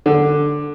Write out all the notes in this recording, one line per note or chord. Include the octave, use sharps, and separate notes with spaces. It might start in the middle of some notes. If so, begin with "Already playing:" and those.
D3